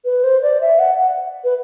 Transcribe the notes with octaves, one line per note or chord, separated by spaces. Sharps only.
B4
C5
D5
E5
F#5
F#5
B4